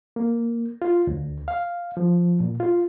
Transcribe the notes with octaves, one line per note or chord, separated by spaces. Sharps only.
A#3
F4
D2
F5
F3
A#2
F4